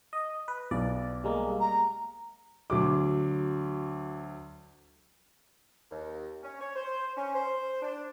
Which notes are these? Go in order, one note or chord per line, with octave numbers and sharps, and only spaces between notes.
D#5
B4
B1 D5
G3 G#3 A#3
A#5
D2 F#3 D6
D#2
C#4
C#5
C5
C#4
C5
D4